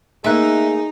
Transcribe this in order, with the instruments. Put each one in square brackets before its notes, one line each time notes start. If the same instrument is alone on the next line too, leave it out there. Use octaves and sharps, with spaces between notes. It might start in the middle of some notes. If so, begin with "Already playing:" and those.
[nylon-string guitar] A3 A#3 [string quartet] D#4 [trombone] G#4 [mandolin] E5 F#6